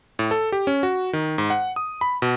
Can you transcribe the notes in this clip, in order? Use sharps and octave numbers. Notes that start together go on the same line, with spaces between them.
A2
A4
G4
C#4
F#4
D#3
G#2
F#5
D#6
B5
B2